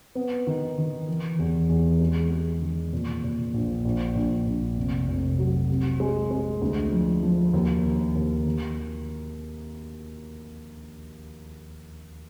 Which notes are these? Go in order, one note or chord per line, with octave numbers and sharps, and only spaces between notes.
B3
D#3
D#3
E3
E2
E2
G#3
G#3
D#3
A#2
A#2
A#1
A#1
A#1
A#1
F1
F1
F#3
C3
G#3
G#3
D2
F3
F3
D#2
D#3
D#2
D#3